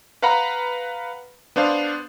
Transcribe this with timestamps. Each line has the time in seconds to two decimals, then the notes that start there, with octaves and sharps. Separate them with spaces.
0.22 B4 F5 F#5 A#5 B5
1.56 B3 D4 C5 F5